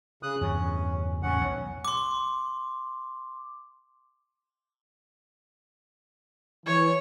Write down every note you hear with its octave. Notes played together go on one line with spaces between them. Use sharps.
C#3 D#6 F#6
E2 G2 C#3 C#4
E2 A2 C#4 F#5
B1
C6 D6
E3 C#5